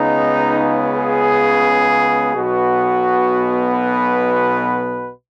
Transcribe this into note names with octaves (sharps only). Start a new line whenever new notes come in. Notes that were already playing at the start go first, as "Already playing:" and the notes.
Already playing: C#2 C#3 B3 D#4
G#4
B1 B2 B3 F#4
B4